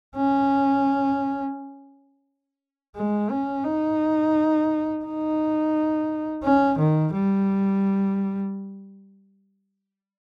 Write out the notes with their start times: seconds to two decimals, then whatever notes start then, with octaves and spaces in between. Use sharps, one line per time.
0.16 C#4
2.96 G#3
3.30 C#4
3.64 D#4
5.05 D#4
6.43 C#4
6.78 D#3
7.14 G3